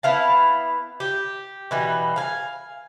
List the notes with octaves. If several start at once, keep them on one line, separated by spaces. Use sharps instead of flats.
B3 E4 F5 A5
G4
B2 E3 G3
F5 G#5